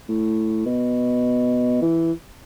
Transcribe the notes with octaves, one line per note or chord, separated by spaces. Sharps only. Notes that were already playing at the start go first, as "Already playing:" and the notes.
A2
B2
E3